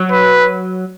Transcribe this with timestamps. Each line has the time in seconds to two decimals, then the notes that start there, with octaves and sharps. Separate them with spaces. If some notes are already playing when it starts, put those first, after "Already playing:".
Already playing: F#3
0.11 B4